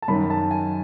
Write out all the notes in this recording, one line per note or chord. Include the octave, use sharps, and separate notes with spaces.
A5
F#2 D#3 F#3 B5
A5
G#5